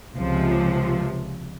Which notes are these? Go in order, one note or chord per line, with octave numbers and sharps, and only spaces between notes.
C#2 C3 F3